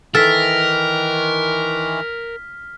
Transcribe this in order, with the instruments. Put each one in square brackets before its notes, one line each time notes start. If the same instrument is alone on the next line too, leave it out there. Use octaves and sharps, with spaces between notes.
[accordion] D#3 E3 [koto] A4 [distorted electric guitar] A#4 [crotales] F6 B6